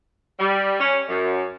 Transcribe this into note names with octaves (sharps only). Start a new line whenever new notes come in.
G3
C#4
F#2